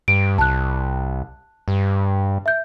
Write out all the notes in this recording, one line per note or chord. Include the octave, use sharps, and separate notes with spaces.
G2 D7
C2 A5 F#6
G2
E5 G6